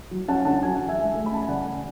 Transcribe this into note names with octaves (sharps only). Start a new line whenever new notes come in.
F#3
C#4 F#5 A5
D3 F#5 A5
F#3 G#5
E3 F#5
E5 G#5
G#3
A3
B5
C#4 A5
G#5
C#3 D5 F#5
E3